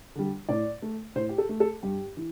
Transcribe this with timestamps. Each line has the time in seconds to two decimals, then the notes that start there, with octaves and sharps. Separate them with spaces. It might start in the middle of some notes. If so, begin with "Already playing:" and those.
0.16 D3 G3
0.49 A2 D5
0.82 A3
1.16 A2 C5
1.29 G4
1.38 A4
1.49 A3
1.60 A4
1.83 G2 G4
2.17 E3